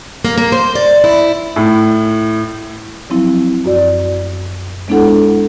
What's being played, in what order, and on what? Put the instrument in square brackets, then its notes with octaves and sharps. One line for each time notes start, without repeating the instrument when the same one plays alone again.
[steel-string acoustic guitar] A#3
A#3
C5
D5
E4
[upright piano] A2
[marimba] F3 F#3 C4 E4
F#2 F#4 D5
G#3 B3 D4 E4 A4 F#5